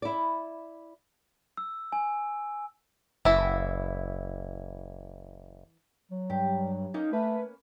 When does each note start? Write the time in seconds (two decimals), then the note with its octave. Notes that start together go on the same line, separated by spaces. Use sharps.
0.02 E4 D5
1.57 E6
1.92 G#5
3.25 F#1 E3 E4
6.11 F#3
6.30 G2 G4
6.94 A#3 C#4 D#4 G6
7.13 A3 B4